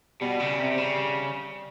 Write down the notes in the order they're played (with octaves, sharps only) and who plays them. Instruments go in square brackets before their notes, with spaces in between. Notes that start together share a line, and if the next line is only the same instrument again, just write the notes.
[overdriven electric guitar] B2 [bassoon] G3
[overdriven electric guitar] C#3
C3
C3
C#3